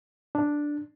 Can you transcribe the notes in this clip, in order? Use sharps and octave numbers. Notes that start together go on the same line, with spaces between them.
D4